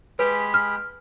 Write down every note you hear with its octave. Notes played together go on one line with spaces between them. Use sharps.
G#3 G4 G#4 B4 B5
F6